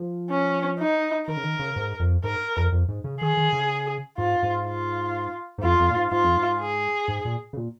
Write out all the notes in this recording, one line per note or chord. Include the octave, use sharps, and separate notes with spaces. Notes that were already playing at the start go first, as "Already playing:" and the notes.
Already playing: F3
C#4
D#4
D#3 A#4
C#3
D#3
C#3
G#2
F2
G#2 A#4
F2
F2
G#2
C#3
D#3 G#4
D#3
C#3
G#2 F4
G#2
F4
G#2
F2 F4
F2
A#2
G#2
G#2 F4
F2
G#2
G#4
G#2
A#2
C#3
A#2